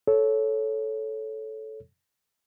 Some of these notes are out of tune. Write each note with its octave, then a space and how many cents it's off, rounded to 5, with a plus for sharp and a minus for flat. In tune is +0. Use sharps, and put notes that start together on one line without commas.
A4 -10 C#5 +0